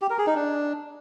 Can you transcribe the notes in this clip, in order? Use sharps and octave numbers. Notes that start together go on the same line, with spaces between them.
G4
A#4
G#4
D#4
D4